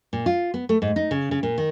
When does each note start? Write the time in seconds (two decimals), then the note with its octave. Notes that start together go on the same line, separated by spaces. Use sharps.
0.13 A#2
0.26 F4
0.54 B3
0.69 A3
0.82 G#2
0.96 D#4
1.11 C#3
1.31 C#3
1.43 A#2
1.58 D#3